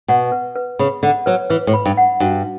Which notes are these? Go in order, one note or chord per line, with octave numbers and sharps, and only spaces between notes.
B2 F#5
B4
B4
C#3 B5
D3 F#5
F#3 B4
E3 B4
A2
B5
G2
F#5
G2 F#4